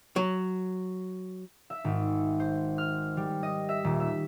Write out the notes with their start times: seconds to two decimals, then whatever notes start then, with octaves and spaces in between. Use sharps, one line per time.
0.16 F#3
1.70 E5
1.84 G#1
2.40 C5
2.78 F6
3.17 G3
3.43 D#5
3.69 E5
3.84 D#1
4.00 E5